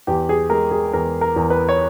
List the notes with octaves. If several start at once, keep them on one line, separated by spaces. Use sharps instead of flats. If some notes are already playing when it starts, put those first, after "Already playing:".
E2 G4
G#4
G#3 A#4
G#4
E2 A#4
A#4
E2
B4
C#5